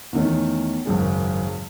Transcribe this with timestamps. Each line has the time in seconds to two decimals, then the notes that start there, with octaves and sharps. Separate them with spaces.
0.13 E2 D#3 A3 C#4
0.86 G#1 F#2 C#3 G#3